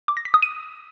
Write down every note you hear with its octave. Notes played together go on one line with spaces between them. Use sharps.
D6
A#6
B6
D#6
D#7